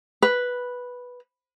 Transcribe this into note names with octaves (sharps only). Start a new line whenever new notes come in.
B4